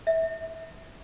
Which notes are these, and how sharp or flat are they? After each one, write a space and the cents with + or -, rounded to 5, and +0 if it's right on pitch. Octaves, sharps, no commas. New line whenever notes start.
E5 -20